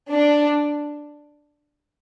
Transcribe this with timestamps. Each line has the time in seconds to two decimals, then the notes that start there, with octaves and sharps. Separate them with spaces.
0.10 D4